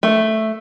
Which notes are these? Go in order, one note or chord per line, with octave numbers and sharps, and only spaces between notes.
A3